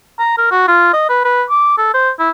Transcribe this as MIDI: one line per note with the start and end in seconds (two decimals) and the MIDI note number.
0.19 0.34 82
0.38 0.47 70
0.51 0.64 66
0.68 0.93 65
0.94 1.07 75
1.09 1.23 71
1.25 1.43 71
1.50 1.75 86
1.78 1.90 69
1.94 2.11 72
2.19 2.30 64